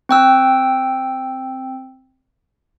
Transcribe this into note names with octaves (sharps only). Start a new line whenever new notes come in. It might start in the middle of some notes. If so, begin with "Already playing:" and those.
C4 G5 E6